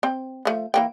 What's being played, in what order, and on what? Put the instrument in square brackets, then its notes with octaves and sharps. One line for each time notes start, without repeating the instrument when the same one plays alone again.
[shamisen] C4 G5
F3 A3
E3 A#3 G5